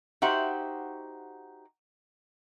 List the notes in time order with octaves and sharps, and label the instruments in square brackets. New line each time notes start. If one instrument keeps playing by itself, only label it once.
[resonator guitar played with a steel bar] D#4 F#4 G4 C5 E5 F#5